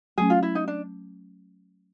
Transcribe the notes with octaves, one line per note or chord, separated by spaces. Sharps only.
F#3 A3 C#4 G#4
F4
E4
D#4
D4